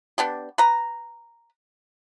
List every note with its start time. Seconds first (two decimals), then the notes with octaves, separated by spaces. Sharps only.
0.18 B3 D4 G4
0.58 B4 A#5